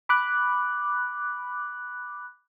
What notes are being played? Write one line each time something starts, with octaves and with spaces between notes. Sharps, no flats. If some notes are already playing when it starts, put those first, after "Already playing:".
B5 D6 F#6